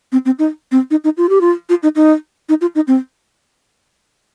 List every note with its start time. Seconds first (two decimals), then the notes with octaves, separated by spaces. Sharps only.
0.12 C4
0.25 C4
0.39 D#4
0.72 C4
0.91 D#4
1.04 D#4
1.17 F4
1.29 G4
1.41 F4
1.70 F4
1.83 D#4
1.96 D#4
2.49 D#4
2.61 F4
2.75 D#4
2.88 C4